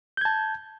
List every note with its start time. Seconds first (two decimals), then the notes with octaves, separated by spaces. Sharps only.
0.17 G6
0.21 G#6
0.25 A5